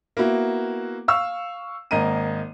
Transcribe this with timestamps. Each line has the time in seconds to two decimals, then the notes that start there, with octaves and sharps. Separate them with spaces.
0.17 A#3 B3 E4 F#4
1.08 F5 C#6 E6
1.91 G#1 A#3 D#5 A#5 D#7